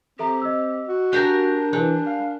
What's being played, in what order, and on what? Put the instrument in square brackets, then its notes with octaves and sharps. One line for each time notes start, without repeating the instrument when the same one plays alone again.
[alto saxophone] C4 [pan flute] G4 [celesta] A4 E5 A#5
[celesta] D#5 E6
[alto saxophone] F#4
[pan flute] D4 [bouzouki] G4 A#4 G#5 [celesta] F#6 G6 A#6
[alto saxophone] E3 [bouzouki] G3 [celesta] A#4 G#5 F#6
[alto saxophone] F5